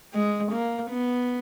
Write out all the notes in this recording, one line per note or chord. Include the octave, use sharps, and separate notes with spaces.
G#3
A#3
B3